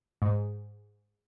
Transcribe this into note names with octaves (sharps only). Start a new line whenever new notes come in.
G#2